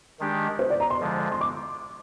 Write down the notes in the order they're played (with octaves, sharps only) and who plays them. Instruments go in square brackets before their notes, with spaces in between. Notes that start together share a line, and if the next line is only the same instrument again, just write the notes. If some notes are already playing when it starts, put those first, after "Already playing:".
[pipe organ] D#3 G#3 D4 G4
[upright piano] C5
D5
A#5
C6
[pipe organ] D3 F3 G#3
[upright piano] C6
D6